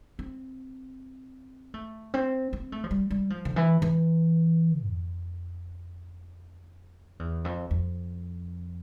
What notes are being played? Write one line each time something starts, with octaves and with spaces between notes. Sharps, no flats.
C4
A3
C4
C4
A3
F3
G3
G3
F3
D3
E3
E3
F2
E2
F2
F2